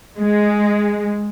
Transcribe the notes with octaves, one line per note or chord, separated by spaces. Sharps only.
G#3